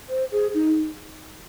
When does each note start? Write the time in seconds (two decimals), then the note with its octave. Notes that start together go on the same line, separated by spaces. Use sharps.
0.09 C5
0.32 G#4
0.54 D#4